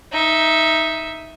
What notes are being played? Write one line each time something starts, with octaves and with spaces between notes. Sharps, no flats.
D#4 E5